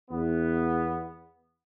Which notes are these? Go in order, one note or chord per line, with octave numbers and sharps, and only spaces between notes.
E2 B3